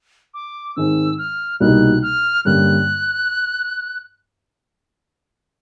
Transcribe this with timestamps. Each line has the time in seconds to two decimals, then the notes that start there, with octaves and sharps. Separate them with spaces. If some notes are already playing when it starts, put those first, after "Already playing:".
0.34 D6
0.76 G#2 D#3 G#3 C4 E6
1.18 F6
1.60 C2 B2 G3 A#3 D#4 F#6
2.03 F6
2.45 G2 D3 G3 A#3 C#4 F#6